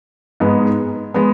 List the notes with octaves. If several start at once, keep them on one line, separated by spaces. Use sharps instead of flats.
G#2 G#3 B3
G#3 B3